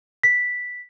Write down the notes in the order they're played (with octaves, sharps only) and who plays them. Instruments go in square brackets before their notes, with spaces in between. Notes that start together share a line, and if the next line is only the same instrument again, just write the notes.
[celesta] B6